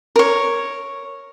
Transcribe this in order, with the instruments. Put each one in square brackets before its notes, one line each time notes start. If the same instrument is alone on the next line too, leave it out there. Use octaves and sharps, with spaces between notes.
[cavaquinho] A#4 C#5